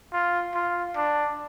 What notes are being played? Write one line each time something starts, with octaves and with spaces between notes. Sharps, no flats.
F4
F4
D4